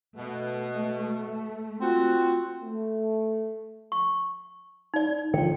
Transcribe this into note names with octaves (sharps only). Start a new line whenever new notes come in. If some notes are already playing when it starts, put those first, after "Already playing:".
B2 A3
C4 F4 F#4
A3
C#6
D#4 D5
D3 D#3 F3 G5